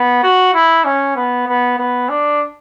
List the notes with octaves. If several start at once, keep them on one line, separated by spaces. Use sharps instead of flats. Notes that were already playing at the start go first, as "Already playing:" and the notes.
Already playing: B3
F#4
E4
C#4
B3
B3
B3
D4